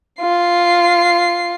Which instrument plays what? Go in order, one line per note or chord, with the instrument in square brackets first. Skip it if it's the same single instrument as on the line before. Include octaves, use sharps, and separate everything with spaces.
[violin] F4 C7